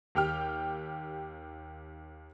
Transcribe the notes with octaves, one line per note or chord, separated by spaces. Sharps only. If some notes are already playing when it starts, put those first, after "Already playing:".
D#2 G4 G5 F6